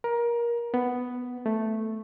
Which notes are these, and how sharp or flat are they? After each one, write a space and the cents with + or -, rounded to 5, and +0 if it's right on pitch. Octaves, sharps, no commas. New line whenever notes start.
A#4 +20
B3 +5
A3 +0